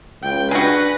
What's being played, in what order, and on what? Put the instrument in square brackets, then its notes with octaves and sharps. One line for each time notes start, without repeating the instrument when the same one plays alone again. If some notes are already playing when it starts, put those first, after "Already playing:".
[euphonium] C#2 [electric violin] G5
[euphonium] D4 [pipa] F#4 G#4 [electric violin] B4 A#6